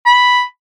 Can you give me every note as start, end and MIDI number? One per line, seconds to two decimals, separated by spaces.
0.06 0.43 83